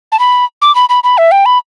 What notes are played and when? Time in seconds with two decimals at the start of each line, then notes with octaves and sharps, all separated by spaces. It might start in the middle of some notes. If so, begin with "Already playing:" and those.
0.12 A5
0.19 B5
0.62 D6
0.75 B5
0.89 B5
1.04 B5
1.18 E5
1.32 G5
1.46 B5